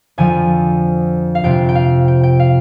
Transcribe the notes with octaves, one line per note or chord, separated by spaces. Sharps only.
F2 D3 F3 G#5
F5
F2 C3 F3 C4 G5
G5
F5
G5
G5
F5